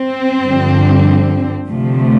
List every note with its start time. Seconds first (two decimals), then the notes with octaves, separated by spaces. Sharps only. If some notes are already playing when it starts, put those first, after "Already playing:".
Already playing: C4
0.45 G2 D3 F3
1.71 D2 C3 F3 A3